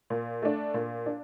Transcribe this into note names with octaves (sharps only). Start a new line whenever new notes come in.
A#2
A3 D4
A#2
D4